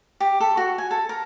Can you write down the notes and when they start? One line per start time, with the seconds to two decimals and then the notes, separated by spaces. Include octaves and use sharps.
0.20 G4
0.40 A4
0.57 F#4
0.78 G#5
0.91 A4
1.09 A#4